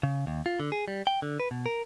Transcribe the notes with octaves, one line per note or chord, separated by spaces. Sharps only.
C#3
D#2
F4
D3
G#4
G3
G5
D3
B4
B2
A#4